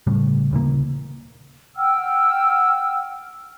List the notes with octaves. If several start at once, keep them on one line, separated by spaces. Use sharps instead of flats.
A2 C#3 G3 A3
D#1 C#3 E3 A#3
F#5 G5 E6 F6